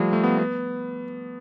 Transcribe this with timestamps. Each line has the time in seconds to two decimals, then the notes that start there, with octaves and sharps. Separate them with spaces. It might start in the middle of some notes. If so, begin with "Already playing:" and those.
Already playing: F3 G3 A3
0.13 A3
0.24 B3
0.38 B3